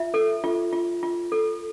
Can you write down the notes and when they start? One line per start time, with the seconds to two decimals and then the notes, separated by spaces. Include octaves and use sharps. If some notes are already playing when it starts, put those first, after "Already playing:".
Already playing: F4 E5
0.14 A4
0.44 F4
0.73 F4
1.03 F4
1.32 A4